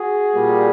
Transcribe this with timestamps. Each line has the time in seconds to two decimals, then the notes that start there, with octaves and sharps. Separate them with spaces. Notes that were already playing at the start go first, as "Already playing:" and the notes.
Already playing: F#4 G#4
0.34 A#2 G3 A#3